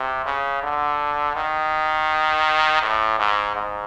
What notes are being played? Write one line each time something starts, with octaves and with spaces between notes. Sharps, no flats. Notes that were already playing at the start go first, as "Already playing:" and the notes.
Already playing: C3
C#3
D3
D#3
A2
G#2
G#2